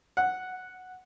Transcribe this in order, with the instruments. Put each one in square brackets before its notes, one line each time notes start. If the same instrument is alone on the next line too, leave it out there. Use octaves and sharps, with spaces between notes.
[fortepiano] F#5